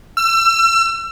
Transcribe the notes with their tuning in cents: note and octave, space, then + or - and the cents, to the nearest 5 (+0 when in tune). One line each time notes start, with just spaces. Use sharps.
E6 +35